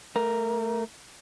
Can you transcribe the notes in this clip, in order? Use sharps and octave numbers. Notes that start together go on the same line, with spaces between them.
A3 A#4